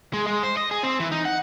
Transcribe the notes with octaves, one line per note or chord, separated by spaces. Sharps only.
G#3
G#3
C5
D#5
G#4
C4
E3
D#4
F#5